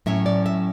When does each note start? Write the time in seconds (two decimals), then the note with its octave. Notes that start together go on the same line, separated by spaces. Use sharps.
0.06 A2 F#3 C#4 E5
0.26 D5
0.46 E5